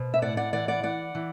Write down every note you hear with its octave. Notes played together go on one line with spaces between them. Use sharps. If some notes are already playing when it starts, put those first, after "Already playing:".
Already playing: B2 C5
E5
A2 D5 F#5
D5 F#5
E3 D5 F#5
D5 F#5
E3 D5 F#5
E3